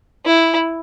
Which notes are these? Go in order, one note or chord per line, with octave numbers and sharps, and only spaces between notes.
E4